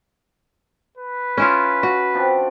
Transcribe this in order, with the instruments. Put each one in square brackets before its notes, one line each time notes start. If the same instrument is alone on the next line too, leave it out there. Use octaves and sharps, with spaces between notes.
[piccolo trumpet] B4
[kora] C#4 E4 F4
F#4
[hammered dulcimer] F3 C4 D4